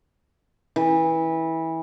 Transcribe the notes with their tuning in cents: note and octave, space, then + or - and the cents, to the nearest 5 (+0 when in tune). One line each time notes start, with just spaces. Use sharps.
E3 -20